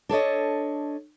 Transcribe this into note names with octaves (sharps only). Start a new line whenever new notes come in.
D4 A4 C#5 D#5